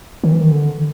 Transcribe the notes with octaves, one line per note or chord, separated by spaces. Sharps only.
D#3
E3
D#3
D3